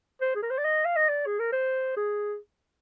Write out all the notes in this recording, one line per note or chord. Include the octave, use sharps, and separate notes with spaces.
C5
G#4
A#4
C5
D5
D#5
F5
D#5
D5
G#4
A#4
C5
G#4